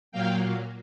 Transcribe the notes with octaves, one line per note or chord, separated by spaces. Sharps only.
A#2 F#3 A#3 F5 G5